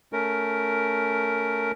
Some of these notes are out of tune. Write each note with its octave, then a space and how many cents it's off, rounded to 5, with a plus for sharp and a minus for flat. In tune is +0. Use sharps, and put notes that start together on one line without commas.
A3 +10 C#4 +20 A#4 +0